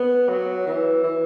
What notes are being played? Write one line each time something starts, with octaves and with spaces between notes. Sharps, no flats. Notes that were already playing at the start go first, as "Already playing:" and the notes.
Already playing: B3
F#3
E3
E3